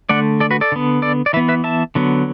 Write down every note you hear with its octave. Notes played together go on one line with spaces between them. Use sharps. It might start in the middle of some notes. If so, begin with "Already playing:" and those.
D3 A3 D5 F#5
A4 D5
F#4 B4
A4 D5
D3 B3
A4 D5
D5
E3 B3 B4 E5
B4 E5
E5 A5
D3 F#3 B3